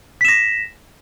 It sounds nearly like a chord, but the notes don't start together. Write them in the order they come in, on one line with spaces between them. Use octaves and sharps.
B6 E7 A#6